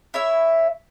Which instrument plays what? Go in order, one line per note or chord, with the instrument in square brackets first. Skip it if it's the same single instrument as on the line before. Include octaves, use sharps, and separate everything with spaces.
[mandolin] E4 C#5 E5